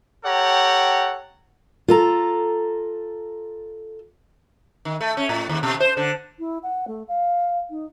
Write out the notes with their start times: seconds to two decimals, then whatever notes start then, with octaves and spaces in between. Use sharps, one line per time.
0.25 G4 A4 C#5 F#5 G5 A#5
1.88 F4 A4 A#5
4.85 D#3
5.01 A3
5.17 C#4
5.29 A2
5.49 D#2
5.63 B2
5.80 C5
5.97 D3
6.39 E4
6.63 F#5
6.87 A3
7.07 F5
7.70 D#4